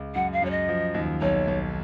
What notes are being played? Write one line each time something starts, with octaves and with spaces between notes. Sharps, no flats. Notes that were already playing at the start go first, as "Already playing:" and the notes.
Already playing: C#2
F#2 F#5
F5
F#2 C#5
D#5
F3
D#2
B1 C#5
B1